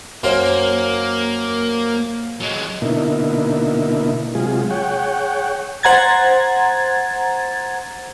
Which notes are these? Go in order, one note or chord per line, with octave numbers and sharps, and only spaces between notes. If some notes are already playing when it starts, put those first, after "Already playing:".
F#2 A#3 C5 F5
F#3 G#3
B2 D3 A#3 D#4 E4
C3 F#3 G#3 F4 G#4
G#4 C#5 F#5 G5
C5 F#5 A#5 G#6 A6